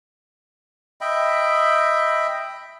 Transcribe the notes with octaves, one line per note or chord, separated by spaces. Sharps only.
D#5 E5 G5 B5